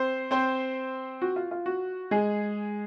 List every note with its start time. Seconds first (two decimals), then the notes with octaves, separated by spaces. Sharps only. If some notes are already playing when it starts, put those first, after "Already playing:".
Already playing: C4 C5
0.31 C4 C5
1.22 F#4
1.36 F4
1.51 F4
1.66 F#4
2.11 G#3 G#4